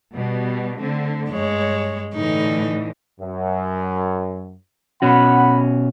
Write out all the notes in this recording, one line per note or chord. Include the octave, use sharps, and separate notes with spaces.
B2 G3
D3 A3 C4
G2 G#3 C#5
A2 D3 E3 D#4
F#2
B2 C#4 F#4 F#5 B5